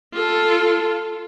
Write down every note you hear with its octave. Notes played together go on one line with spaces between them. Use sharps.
F4 A4